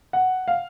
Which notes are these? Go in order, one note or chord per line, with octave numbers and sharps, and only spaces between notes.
F#5
F5